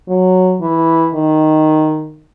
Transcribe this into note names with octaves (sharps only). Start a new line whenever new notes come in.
F#3
E3
D#3